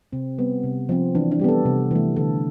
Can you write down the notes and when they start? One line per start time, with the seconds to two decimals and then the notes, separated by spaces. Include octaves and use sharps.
0.13 C3 C4
0.38 G3 B3
0.64 C3
0.89 F3 C4
1.15 E3 D4
1.31 D4
1.39 G3 G4
1.44 B3 A4
1.65 C3
1.91 E3 A3
2.16 D3 A4